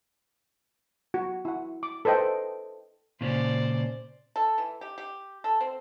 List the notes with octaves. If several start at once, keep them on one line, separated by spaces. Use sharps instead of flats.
F#4
E4 F#5
D6
A4 B4 C5 D#5 G5
A#2 C#3 C#4 C5 D5
A4
E3
G4
G4
A4
C4